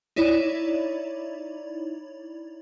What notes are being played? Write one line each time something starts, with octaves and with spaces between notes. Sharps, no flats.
D#4 E4 C#5 D5